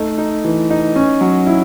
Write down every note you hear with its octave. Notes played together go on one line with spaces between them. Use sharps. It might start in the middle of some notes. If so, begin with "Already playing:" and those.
Already playing: A3 D#4
D#4
E3
D#4
C#4
F#3
E4